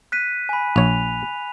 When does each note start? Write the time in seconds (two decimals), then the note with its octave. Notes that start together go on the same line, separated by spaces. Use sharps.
0.12 F#6 B6 D#7
0.49 G#5 B5
0.76 A#1 C#5 F7